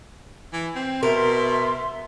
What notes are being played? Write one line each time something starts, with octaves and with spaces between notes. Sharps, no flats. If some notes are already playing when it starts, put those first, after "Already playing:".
E3
C4
B2 A#4 E5 C6